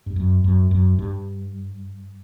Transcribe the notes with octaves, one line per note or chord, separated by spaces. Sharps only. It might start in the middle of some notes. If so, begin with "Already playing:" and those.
G2
F#2
F#2
F#2
G2